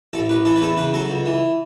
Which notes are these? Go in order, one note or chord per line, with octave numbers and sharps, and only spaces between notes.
A1 A4
A1 B4
E3 A4
B4
E2 A4
C#3 B4
F#3 A4
C#2
E3